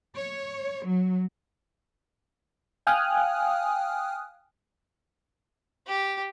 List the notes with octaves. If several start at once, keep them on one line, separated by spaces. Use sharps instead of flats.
C#5
F#3
F5 G5 G#5 D#6 F6 F#6
G4